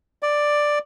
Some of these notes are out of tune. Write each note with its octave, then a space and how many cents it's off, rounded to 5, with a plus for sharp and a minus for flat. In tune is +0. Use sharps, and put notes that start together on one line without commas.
D5 +5